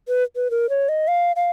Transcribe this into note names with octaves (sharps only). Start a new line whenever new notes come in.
B4
B4
A#4
C#5
D#5
F5
F5